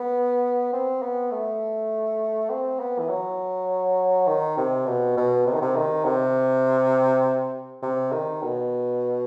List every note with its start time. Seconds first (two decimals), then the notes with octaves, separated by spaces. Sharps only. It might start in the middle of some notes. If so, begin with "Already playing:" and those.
Already playing: B3
0.73 C4
1.02 B3
1.32 A3
2.50 C4
2.80 B3
2.99 E3
3.10 F#3
4.27 D#3
4.57 C3
4.87 B2
5.17 B2
5.46 C3
5.54 D#3
5.62 C3
5.76 D#3
6.05 C3
7.82 C3
8.13 D#3
8.43 B2